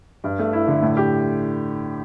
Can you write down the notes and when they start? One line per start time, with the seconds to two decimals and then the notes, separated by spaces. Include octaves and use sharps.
0.24 G2
0.39 A3
0.53 E4
0.67 D3
0.82 A2
0.97 G4